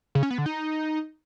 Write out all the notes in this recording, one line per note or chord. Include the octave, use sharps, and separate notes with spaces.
C#3
C#4
B3
D3
D#4